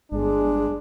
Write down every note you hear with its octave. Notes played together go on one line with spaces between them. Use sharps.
G1 G#3 D4